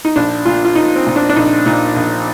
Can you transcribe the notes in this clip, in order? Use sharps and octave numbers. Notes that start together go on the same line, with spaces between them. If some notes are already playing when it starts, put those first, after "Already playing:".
D#4
A#1 D4
A#2 F4
F4
A#1 D#4
C4
A#2
D4
D4
A#1 D#4
A#2 D#4
A#1